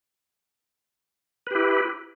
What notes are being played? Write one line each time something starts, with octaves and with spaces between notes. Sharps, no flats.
E4 G4 B4